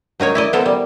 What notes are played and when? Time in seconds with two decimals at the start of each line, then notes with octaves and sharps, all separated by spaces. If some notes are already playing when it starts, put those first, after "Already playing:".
0.20 F#3 D#4 A#4 C#5
0.35 E4 D5 D#5
0.53 B3 A4 A#4 C5
0.66 G3